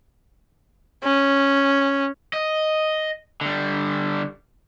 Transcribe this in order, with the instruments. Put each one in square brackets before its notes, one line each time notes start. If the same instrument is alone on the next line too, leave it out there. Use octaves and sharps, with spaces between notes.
[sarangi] C#4
[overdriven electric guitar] D#5
D3 G3